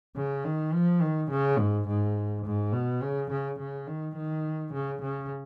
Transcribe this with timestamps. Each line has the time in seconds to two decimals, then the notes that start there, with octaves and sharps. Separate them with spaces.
0.16 C#3
0.45 D#3
0.73 F3
1.01 D#3
1.31 C#3
1.59 G#2
1.88 G#2
2.45 G#2
2.73 B2
3.02 C#3
3.31 C#3
3.59 C#3
3.87 D#3
4.17 D#3
4.74 C#3
5.02 C#3